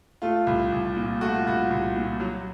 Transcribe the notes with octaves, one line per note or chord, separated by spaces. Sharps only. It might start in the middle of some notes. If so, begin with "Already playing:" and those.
A3 F4
C2
C2
A#2
A3 F#4
F4
C2 F#4
C2
A#2
F#3